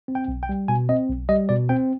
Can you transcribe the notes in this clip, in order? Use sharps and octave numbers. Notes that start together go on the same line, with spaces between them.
C4
G5
B1
G5
G3
B2 G#5
C4 D#5
B1
G3 D#5
B2 D5
C4 G5